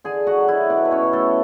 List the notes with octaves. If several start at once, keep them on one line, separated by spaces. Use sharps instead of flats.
D3 G#4 G#5
F#4 F#5
F#3
E4 E5
B2 D4 D5
B4
C#4 C#5
B2
A3 A4